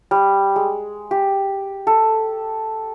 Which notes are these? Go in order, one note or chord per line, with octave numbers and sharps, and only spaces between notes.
G3
G#3
G4
A4